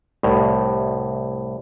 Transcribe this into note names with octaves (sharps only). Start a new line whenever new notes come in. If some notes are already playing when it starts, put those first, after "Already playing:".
C2 A2